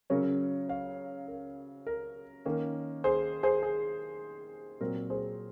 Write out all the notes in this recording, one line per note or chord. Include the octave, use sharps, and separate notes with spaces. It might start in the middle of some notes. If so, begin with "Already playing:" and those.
C#3 F#3 C#4 A#4 C#5
C#5 F5
A#4
A#4
D#3 A#3 C#4
G#4 C5
G#4 C5
G#4
A#2 F#3 C4 A#4
G#4 C5